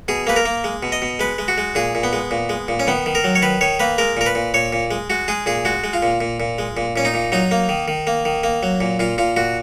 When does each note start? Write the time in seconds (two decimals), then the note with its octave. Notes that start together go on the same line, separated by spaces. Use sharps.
0.08 B2 G#4
0.27 A#3 B4
0.36 A#4
0.45 A#3
0.64 G#3
0.83 B2
0.92 D#5
1.02 B2
1.19 G#3 B4
1.38 G#3
1.48 F#4
1.58 G#3
1.75 A#2 G#4
1.95 A#2
2.03 B3
2.13 G#3
2.31 A#2
2.49 G#3
2.68 A#2
2.80 C#4
2.87 D#3 B3
3.06 D#3
3.15 A#4
3.24 F#3
3.35 C#5
3.42 D#3 B4
3.61 D#3 C#5
3.80 A#3 B4
3.98 G#3 A#4
4.17 A#2 A#4
4.26 B4
4.35 A#2
4.54 A#2 C#5
4.73 A#2
4.91 G#3
5.10 G#3 F#4
5.28 G#3 G#4
5.46 A#2 G#4
5.65 G#3 F#4
5.84 G#3
5.93 F4
6.03 A#2
6.21 A#2
6.40 A#2
6.58 G#3
6.77 A#2
6.96 A#2 C#4
7.05 D#4
7.14 A#2
7.32 F#3 D#4
7.51 A#3
7.69 D#3
7.88 D#3
8.07 A#3
8.25 D#3
8.43 A#3
8.63 F#3
8.81 A#2
8.99 A#2 F4
9.18 A#2 F4
9.36 A#2 F#4